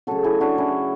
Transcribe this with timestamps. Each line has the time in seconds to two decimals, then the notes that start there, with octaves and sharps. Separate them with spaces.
0.07 C#3 F#3 A3 F#4 A4
0.24 E4 G#4
0.40 D4 F#4
0.58 C#4 E4